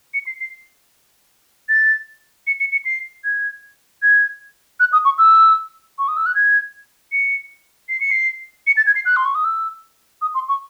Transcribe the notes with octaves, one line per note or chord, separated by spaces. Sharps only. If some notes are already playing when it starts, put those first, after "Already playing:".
C#7
C7
C7
A6
C#7
C#7
C#7
C7
G#6
G#6
F#6
D#6
C#6
E6
C#6
D#6
E6
F#6
G#6
C#7
C7
C#7
C7
C#7
A6
G#6
C7
F#6
C6
C#6
D#6
E6
D#6
C6
C#6